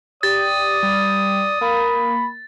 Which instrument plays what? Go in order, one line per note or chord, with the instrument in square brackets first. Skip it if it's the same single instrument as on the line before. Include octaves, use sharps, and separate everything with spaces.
[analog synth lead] G4 [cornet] D5 [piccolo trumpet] D#6 [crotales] A6
[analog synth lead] G3
[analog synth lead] A#3 [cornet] B5